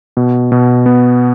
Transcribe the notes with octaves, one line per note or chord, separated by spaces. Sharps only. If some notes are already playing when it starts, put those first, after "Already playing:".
B2
B2
B3